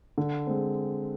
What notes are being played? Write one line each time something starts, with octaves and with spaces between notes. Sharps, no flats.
D3
G#3 C4